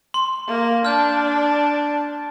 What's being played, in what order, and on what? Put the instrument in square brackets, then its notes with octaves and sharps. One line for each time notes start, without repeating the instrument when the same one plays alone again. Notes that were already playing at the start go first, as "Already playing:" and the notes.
[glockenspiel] C6
[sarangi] A#3
[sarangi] D4 [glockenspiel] F6 G6